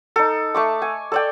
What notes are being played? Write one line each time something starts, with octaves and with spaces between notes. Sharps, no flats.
D#4 A4
A3 C#6 D6
G#5
A4 D5 G5